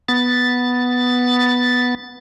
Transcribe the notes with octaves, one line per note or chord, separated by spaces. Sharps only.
B3 A6